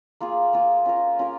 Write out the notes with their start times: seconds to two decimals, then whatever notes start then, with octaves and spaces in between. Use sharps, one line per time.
0.21 A#3 F4 G#4
0.53 A#3 F4 G#4
0.85 C#4 F4 A#4
1.19 C#4 F4 A#4